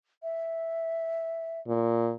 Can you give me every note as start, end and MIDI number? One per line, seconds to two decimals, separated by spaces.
0.23 1.60 76
1.68 2.13 46